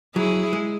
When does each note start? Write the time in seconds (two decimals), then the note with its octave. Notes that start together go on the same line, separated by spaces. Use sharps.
0.16 F#3 E4 G#4
0.53 G#3